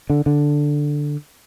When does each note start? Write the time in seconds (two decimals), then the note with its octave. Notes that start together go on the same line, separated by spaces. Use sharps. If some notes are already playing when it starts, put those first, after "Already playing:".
0.10 D3
0.26 D3